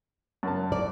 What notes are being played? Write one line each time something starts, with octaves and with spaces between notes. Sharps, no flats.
F#2 A#4 A5
D5